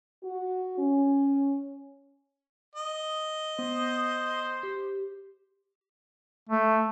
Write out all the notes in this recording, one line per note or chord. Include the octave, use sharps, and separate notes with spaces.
F#4
C#4
D#5
B3 C5
G4
A3